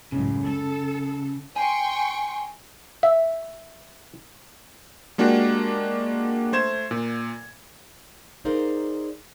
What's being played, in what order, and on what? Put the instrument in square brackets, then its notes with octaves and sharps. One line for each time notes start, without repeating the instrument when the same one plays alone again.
[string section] C#2 F#2 A2 [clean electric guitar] C#3
[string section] A4
[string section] G5 C6 C#6 [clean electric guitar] G#5
[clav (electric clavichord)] E5
[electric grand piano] G#3 A#3 D4 F#4 G4
A3 C5 G#6 E7
A#2
[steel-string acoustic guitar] D#4 G#4 A#4 C5 D5 F5